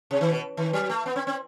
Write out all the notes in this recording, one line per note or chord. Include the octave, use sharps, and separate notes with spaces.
C3
D#3
B2
D#3
F#3
A3
B3
C4
C4